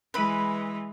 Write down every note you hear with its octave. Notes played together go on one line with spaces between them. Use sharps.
E3 G#3 B4 B5